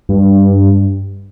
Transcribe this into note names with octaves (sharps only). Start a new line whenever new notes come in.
G2